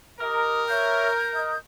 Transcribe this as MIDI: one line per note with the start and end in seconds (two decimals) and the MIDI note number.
0.20 0.63 67
0.20 1.55 70
0.20 0.63 75
0.68 1.08 73
0.68 1.08 76
0.68 1.58 91
1.34 1.54 75